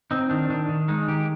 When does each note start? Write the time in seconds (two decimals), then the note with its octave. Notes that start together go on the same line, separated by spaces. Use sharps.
0.11 C4 D#4
0.30 D#3 D4
0.49 D#3 D4
0.69 D#3
0.88 G#3 D#4
1.08 D#3 G4